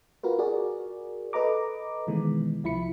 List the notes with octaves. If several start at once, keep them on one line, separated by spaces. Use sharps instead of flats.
F4 F#4 A#4 B4
F#4 G#4 A#4 D5
A4 B4 D#5 A#5 D6
B2 D#3 E3 G#3 B3
C2 F3 E4 B5 C#7